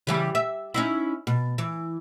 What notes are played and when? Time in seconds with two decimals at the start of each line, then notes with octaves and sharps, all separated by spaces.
0.07 C#3 E3 G3
0.35 E5
0.74 C#4 D#4 E4
1.27 B2
1.58 E3